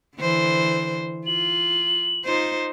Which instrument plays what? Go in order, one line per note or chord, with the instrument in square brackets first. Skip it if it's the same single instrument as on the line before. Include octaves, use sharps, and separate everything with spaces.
[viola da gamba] D3 E3 C5
[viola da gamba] F4 [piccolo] F#7
[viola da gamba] D#4 F4 C5